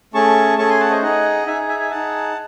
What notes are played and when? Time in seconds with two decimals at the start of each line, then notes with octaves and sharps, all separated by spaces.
0.14 A3 C#4 G#4 A5 C#6
0.58 A3 C#4 G#4 A5 C#6
0.69 G#5 C6
0.80 F#5 A5
0.91 C5 D#5
1.02 D#4 G#4 D#5 F#5
1.47 D#4 G#4 E5 G#5
1.68 E5 G#5
1.80 E5 G#5
1.91 D#4 G#4 F#5 A5